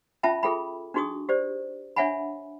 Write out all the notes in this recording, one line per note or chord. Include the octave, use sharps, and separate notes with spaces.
C#4 F4 E5 G5 A5 B5
F4 G#4 A4 G5 B5
D4 D#4 F#4 G#4 C#6 D#6
G4 C5 D5
D4 C#5 E5 F#5 G#5 B5